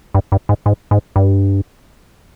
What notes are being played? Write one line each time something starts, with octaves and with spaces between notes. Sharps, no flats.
G2
G2
G#2
G#2
G#2
G2